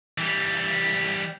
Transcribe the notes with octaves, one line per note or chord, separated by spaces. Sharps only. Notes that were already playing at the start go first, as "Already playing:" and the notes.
E3 G3